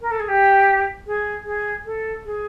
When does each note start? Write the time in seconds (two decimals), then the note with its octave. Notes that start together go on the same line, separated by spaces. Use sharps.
0.01 A#4
0.11 A4
0.19 G#4
0.28 G4
1.06 G#4
1.45 G#4
1.85 A4
2.25 G#4